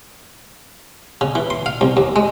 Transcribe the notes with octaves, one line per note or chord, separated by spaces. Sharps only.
C#3
E3
C6
F5
C2
D#2
G#3